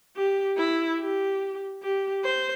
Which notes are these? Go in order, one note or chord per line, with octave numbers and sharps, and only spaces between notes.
G4
E4
G4
G4
C5